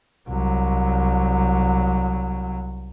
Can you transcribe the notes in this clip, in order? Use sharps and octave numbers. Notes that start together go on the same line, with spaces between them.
C2 F#3